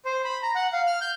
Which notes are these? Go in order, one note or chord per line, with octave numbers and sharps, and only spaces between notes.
C5
B5
A#5
F#5
F5
F6
G6